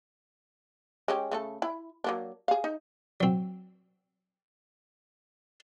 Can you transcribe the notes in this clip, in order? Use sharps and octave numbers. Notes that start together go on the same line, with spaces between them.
G#3 C#4 G4
C#3 A3 A4
E4 B5
F#3 A#3 D4
G#4 F5
D#4
F#3 C4